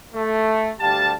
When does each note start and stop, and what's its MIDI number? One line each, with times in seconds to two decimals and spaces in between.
0.15 0.71 57
0.80 1.12 38
0.80 1.12 55
0.80 1.12 67
0.80 1.12 77
0.80 1.12 81